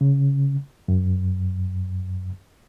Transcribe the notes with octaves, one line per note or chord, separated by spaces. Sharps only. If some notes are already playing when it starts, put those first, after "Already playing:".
C#3
F#2